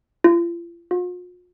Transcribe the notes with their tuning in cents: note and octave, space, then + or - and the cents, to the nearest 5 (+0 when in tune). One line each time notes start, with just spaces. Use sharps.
F4 -40
F4 +45